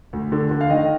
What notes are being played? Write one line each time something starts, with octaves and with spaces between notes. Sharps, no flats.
D2
D3
D3
F5
D#3 D#5